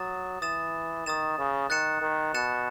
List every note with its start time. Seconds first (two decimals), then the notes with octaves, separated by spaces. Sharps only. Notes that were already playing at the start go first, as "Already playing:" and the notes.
Already playing: F#3 D#6 A6 E7
0.42 E3 D#6 A6 E7
1.06 D#3 D#6 A6 E7
1.38 C#3
1.70 D#3 F#6 A6 C#7 E7
2.02 D#3
2.34 B2 F#6 A6 C#7 E7